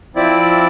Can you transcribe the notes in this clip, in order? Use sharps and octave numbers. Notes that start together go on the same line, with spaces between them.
F3 C4 E4 D5